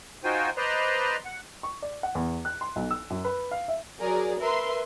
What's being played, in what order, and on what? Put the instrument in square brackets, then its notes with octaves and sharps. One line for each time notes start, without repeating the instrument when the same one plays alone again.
[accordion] D#4 F4 F#4 C5 G5 G#5
B4 C5 D5 D#5 A#5 C6
F#5
[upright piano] C#6
D5
F#5
E2
F#6
C6
B1
E6
F#2
B4
F5
E5
[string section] F#3 G#4 A#4 D5
A#4 B4 E5 C6